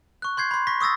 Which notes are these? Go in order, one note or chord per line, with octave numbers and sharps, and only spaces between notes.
C#6 F#6
C6 G6 G#6 C7
B5 C6
C#6 A#6 B6
C#6 D#6 E6 A6 A#6